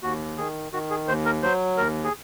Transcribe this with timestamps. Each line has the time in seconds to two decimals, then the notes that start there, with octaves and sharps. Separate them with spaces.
0.02 D#2 F#4
0.38 D#3 G#4
0.72 D#3 F#4
0.90 G#4
1.08 D#2 C5
1.26 A#4
1.43 F#3 C5
1.77 D#2 A#4
2.04 G#4